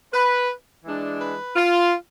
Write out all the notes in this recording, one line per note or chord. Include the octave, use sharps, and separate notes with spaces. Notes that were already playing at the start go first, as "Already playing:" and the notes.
B4
E3 G#3 D4
B4
F4